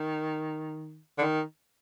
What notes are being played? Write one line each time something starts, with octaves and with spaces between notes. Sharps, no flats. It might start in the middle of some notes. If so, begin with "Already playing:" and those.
Already playing: D#3
D3
D#3